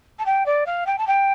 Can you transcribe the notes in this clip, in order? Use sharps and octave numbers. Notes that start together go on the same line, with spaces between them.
A5
G5
D5
F5
G5
A5
G5